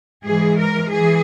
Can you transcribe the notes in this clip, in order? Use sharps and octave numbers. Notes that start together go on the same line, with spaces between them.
G#2 E3 G#4
A#4
E3 G#4